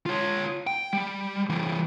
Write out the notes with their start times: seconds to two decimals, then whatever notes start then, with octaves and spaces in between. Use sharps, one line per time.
0.06 F4 C#5
0.67 G5
0.93 G3
1.49 E3 G3